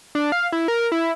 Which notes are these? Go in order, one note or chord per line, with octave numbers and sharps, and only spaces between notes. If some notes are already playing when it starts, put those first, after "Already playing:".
D4
F5
E4
A#4
E4